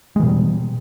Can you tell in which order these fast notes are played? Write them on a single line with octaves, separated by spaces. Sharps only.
G#3 E3 B2 G3